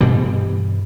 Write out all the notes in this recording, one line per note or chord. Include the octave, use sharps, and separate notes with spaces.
G2 B2 E3 G3